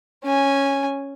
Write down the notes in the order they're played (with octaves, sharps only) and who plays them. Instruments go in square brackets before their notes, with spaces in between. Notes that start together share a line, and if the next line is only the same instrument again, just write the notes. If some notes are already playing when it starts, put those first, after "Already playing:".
[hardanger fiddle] C#4 G#5